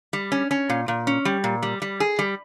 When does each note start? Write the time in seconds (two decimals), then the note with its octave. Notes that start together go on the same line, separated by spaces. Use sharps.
0.13 G3
0.32 C#4
0.51 C#4
0.70 A#2
0.88 A#2
1.07 C#4
1.25 G3
1.44 A#2
1.63 G3
1.82 G3
2.00 G#4
2.19 G3